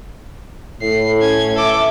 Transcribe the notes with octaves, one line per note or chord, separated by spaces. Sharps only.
A2 C7
C#4 G#6
A4 B4 E5 D6